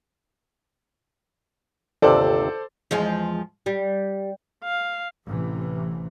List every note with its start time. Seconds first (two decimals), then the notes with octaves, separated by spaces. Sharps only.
2.02 G1 D#2 C3 A4 C5 D5
2.91 E2 F3 G#3
3.66 G3
4.64 F5
5.26 A1 C3 E3